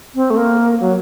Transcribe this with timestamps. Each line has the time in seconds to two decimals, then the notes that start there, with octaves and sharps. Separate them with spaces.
0.15 C4
0.30 A3
0.37 A#3
0.80 F#3